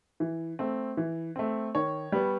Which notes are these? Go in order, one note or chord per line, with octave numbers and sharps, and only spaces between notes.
E3
A3 C4
E3
A3 C4
D#3 C#5
G3 B3